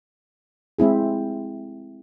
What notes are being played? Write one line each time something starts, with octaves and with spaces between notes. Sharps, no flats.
G#3 C4 E4 G#4